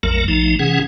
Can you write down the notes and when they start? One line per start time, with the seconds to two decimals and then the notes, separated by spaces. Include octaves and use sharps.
0.03 A#1 F2 F#3 A3 A#4
0.28 A#1 F3 A3 D#4
0.59 C3 E3 C#4 G#4 F#5